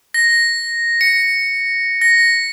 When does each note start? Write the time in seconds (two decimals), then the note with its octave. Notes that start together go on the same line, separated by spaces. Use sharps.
0.14 A#6
1.01 C#7
2.01 A#6